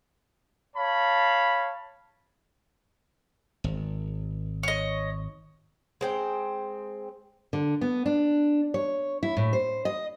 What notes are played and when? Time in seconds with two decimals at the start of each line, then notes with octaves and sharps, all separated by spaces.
0.75 C#5 F5 A5 B5
3.64 G#1
4.63 C#5 D#5
6.01 G#3 C4 G5
7.53 D3
7.81 B3
8.06 D4
8.74 C#5
9.23 E4
9.37 A2
9.53 C5
9.85 D#5